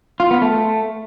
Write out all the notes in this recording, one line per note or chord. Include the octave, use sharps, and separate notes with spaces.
F4
B3
A3